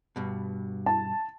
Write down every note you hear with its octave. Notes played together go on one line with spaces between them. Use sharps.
G2 B2
A5